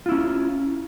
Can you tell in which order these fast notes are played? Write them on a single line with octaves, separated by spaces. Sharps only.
F4 E4 C#4